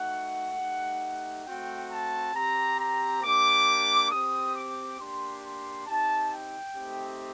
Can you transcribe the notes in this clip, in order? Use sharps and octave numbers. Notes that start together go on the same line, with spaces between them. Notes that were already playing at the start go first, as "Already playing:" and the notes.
Already playing: A3 D#4 F#4 F#5
A3 D#4 G4
A3 C4 F#4 G5
A5
C4 G4 A#5
A#5
A#3 D4 G4 D6
C4 G4 D#6
D6
A#3 D4 G4 C6
C6
C4 D#4 G4 A5
G5
A3 C4 D#4 G4